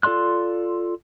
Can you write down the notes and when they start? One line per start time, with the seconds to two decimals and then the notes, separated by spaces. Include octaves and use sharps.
0.03 F4 A4 D5 C6 F#6